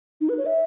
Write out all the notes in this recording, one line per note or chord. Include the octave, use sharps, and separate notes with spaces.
D#4
B4
C#5
E5